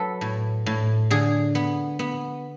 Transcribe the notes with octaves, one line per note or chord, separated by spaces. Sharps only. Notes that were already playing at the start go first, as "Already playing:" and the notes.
Already playing: F#3 A4 B4
A2
A2
D3 G#4
B3
B3